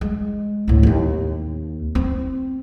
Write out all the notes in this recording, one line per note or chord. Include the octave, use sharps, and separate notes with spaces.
G#3
D2 A2
D#2 C4
C4